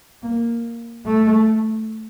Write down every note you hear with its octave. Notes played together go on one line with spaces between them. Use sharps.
A#3
A3